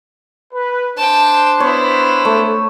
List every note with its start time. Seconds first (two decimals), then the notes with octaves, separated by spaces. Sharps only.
0.54 B4
0.97 D4 C5 G5 A5
1.60 B3 E4 C#5
2.25 A3